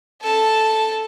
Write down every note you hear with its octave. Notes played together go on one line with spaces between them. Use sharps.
A4 A5